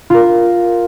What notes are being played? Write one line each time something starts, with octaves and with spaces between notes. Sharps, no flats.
F4 A#4